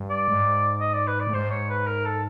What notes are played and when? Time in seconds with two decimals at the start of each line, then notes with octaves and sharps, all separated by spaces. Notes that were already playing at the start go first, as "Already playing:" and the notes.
Already playing: G2
0.10 D5
0.28 G#2
0.80 D#5
0.93 D5
1.07 B4
1.20 D5
1.27 A2
1.33 G#2 C5
1.51 C#5
1.70 B4
1.87 A#4
2.05 A4